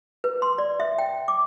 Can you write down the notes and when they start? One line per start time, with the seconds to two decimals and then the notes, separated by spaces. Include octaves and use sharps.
0.24 B4
0.42 C6
0.58 D5
0.80 E5
0.98 G5
1.28 D6